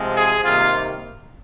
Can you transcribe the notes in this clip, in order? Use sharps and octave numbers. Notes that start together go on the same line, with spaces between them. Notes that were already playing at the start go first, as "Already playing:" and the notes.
Already playing: C3 F3 G#3 C4
G#4
C3 D#3 G3 A#3 F4